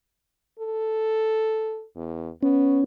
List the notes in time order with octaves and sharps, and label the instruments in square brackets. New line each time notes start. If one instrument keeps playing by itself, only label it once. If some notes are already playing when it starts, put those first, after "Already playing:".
[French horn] A4
E2
[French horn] B3 [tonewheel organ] C#4